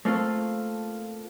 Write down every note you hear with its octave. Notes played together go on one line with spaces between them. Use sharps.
A3 A#3 C4 F4 A4